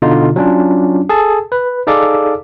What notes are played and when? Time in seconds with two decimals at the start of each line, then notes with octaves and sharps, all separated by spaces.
0.02 B2 D3 D#4 F4
0.36 F#3 C#4 D4 F4
1.09 G#4 A4 A5
1.52 B4
1.87 D#4 G#4 A4 D5 F5 D6